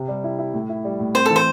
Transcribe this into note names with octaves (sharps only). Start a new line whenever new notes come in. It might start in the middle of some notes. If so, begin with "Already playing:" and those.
Already playing: C3
G3
E4
E4
A2
E4
G3
A2
C4 C5
E3 A4
C5